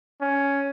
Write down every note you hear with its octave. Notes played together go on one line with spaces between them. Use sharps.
C#4